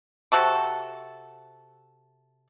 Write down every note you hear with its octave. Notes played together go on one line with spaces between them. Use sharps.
C3 F#4 A4 C#6